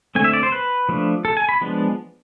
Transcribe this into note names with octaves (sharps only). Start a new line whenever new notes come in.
D3 A3 C4 G#5
E5
D5
C5
B4
F3 A3 D4
A4
G#5
B5
F3 G#3 B3 D4